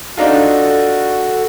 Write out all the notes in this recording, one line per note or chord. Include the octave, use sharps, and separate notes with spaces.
D4 D#4 F4 F#4 A4